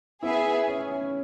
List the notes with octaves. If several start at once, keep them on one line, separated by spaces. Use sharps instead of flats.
B3 E4 G#4 E5 G#5
C#4
C#4